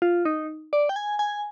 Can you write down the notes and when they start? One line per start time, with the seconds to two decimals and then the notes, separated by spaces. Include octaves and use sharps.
0.02 F4
0.25 D#4
0.73 D5
0.89 G5
0.96 G#5
1.19 G#5